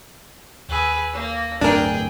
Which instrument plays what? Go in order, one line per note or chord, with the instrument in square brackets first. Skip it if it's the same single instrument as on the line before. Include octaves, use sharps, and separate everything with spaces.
[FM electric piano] D#2 E6 [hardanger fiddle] G#4 B4
[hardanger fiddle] A#3
[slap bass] D1 G2 [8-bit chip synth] D4 A#4 [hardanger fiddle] G#4 G5